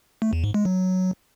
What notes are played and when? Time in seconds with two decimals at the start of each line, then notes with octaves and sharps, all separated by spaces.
0.22 A3
0.33 E2
0.44 G#2
0.54 G#3
0.65 F#3